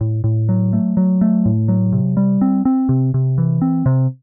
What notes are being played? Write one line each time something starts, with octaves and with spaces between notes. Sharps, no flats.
A2
A2
F#3
A3
F#3
A3
A2
F#3
C3
G3
C4
C4
C3
C3
E3
C4
C3